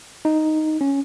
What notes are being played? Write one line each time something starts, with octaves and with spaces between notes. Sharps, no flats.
D#4
C#4